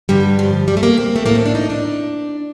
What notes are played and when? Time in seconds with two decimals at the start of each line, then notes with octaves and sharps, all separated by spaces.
0.09 G2 D3 G3
0.39 F3
0.68 G3
0.77 A3
0.83 A#3
0.98 C4
1.16 A3
1.26 A2 A#3
1.35 C4
1.46 D4
1.55 D#4
1.70 D4